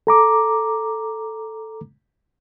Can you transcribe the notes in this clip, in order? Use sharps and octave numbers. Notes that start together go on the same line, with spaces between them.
A4 A#5 D6